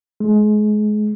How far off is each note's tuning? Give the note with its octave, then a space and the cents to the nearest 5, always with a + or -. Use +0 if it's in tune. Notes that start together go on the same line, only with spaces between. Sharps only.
G#3 +30